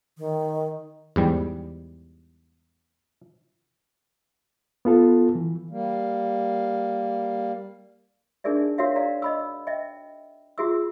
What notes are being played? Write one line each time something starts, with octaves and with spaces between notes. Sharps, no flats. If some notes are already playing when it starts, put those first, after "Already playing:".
D#3
E2 G#2 G3
B3 F4 A4
E3
G3 A#3
D4 D#4 G#4 A#4 D5 E5
F#4 A#4 C#5 E5 F5
D5 F5 A#5
D#5 B5 E6
D#5 E5 G5
F4 F#4 G#4 E5 E6